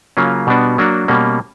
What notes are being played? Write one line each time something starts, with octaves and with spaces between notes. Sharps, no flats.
C#3 F#3 A#3 C#4 F4
B2 G3 B3 D4 F#4
F#3 A#3 D4 F#4
B2 G3 A#3 C#4